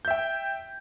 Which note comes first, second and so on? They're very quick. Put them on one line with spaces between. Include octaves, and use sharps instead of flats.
G6 E5 G5